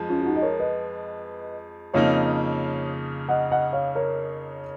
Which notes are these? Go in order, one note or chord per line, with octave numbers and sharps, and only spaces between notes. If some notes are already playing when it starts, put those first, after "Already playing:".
Already playing: F2 F3 G#3
C#4 F4
F4
D#4 F#4
D#5
A#4 C#5
B4 D#5
F2 C#3 F3 A#3 D#4 C#5 F5
D#5 F#5
D#5 F#5
C#5 F5
A#4 C#5